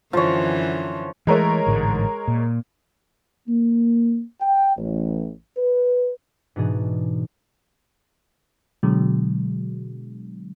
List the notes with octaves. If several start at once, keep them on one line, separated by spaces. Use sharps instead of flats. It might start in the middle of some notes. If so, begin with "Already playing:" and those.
F#2 D3 E3 F3 C#5
E3 G#3 A3 A#4 C#5
A1 G#2 D3
A#2
A#3
G5
A1
B4
G#2 B2 E3 D4 D#4 G#4
B2 D3 F#3 G#3